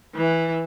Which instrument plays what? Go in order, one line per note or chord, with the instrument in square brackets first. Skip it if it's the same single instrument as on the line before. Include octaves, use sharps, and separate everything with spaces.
[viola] E3